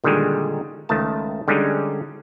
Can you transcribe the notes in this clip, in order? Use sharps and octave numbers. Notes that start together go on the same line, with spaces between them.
A#2 D3 D#3 G3 G#3
C#2 D#3 A3 A5
D3 G3 G#3 C#4 D#4